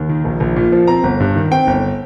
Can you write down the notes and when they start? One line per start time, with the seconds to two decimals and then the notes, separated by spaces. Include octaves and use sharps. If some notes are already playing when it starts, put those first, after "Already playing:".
Already playing: D#2
0.09 D#3
0.25 A#1
0.40 A#1
0.56 A#2
0.72 F3
0.88 C4 A#5
1.03 G1
1.20 G2
1.36 D#3
1.51 C4 G5
1.67 G1